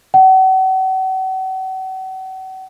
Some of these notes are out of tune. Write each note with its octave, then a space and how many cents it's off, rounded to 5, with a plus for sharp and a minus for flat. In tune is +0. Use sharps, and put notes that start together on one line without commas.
F#5 +40